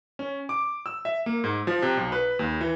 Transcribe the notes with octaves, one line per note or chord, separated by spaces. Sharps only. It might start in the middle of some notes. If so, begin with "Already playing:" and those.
C#4
D6
E6
E5
A#3
G#2
F3
C3
B1
B4
D#2
E3